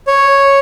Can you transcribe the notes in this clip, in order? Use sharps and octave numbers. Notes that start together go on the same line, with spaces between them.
C#5